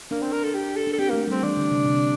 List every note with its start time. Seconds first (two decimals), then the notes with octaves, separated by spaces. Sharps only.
0.11 A#3 D4
0.22 C4
0.32 A#4
0.43 A4
0.54 G4
0.76 A4
0.87 D4
0.93 A4
0.98 C4 G4
1.10 A3 A#3
1.28 G3 C4
1.43 E3 D4
1.57 D3
1.71 C3
1.86 C3